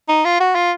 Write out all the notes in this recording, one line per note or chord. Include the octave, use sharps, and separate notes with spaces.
D#4
F4
F#4
F4